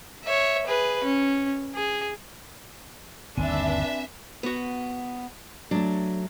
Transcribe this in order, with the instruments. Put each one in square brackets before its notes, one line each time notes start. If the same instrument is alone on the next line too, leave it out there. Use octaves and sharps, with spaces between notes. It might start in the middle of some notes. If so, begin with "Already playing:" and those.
[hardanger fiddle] C#5 E5
G#4 B4
C#4
G#4
[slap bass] G1 D#2 D#3 [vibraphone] C4 G#5 [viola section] D4 B4 [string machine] E5
[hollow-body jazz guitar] B3 F#4
[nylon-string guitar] F#3 A3 [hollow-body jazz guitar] D4